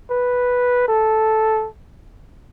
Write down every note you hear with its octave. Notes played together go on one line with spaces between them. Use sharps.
B4
A4